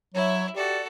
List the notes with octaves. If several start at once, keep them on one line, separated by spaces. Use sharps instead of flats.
F#3 E4 C#5 E5
F#4 G4 A4 D5